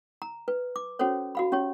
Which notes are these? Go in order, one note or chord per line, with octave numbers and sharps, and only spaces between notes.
A#5
B4
D6
C#4 F#4 A4 C5 C#5
F#4 F5 B5
C#4 G4 C#5